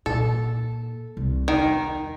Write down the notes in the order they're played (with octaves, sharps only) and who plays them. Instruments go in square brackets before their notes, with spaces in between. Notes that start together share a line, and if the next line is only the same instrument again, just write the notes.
[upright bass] A#2 [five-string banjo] A4
[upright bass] C2
[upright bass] E2 [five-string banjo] D#3